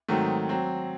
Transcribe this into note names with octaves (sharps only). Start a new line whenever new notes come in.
G#2 D#3 F#3 A3 C4
F#3 C4